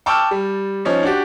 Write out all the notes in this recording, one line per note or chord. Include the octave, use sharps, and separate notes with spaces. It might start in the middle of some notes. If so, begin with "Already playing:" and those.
G5 A5 C#6 D6 E6 F6
G3
F3 C#4 D#4
D4 F#4 G4